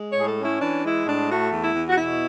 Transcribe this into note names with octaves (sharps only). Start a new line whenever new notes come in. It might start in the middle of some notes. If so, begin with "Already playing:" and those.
Already playing: G#3
C#5
A2
G#4
A4
C#4
E4
E3 D4
G#3 E4
A2 D4
A3 F#4
E2
E4
E2
F#4
B2 E4